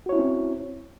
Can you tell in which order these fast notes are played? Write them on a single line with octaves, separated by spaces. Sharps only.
F#4 C#5 E4 C#4 C4